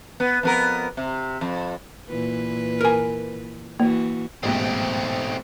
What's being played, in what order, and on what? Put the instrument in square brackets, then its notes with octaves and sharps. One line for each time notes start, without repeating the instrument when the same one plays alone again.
[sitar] B3
F2 B3 A#4
C3
F2
[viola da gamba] A#2 E3 B4
[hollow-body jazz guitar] A#4 G#5
[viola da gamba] E3 F#4 [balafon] A#3
[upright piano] A1 G#2 B2 [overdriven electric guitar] A3 C4